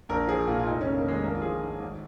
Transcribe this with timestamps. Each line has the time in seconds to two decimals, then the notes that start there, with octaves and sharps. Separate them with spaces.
0.09 A#1 A#4
0.27 F3 G#4
0.47 A#2 F4
0.59 F4
0.66 F1 D#4
0.81 C#3 C#4
0.94 A#3
1.05 D#2 G#3
1.23 A#1 A#3
1.35 F4
1.42 F3 G#4
1.61 G#2
1.80 G#1